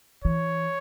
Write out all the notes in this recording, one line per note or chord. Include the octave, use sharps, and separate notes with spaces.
E3 C#5